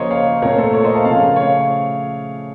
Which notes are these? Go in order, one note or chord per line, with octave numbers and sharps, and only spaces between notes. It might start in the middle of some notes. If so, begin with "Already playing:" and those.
Already playing: C#3 F3 A#3 A#4 C5 C#5 D#5
C#5 F5
A#2 A3 A#4 C#5
A4 C5
A#4 C#5
C5 D#5
F5 A5
C#3 F3 A3 F5 A5
C#5 F5